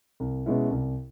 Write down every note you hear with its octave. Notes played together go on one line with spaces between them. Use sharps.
C2
B2 G#3 C#4 E4
C2